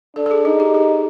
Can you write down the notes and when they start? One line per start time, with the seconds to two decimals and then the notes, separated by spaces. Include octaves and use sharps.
0.16 D4 A4
0.26 A4
0.31 G#4
0.45 D#4 G#4
0.60 G4
0.74 G#4